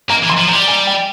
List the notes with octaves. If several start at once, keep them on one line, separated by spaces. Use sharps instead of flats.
A#3 A#5
E3
C6
F3
F3 A#5
G3
G#5
G5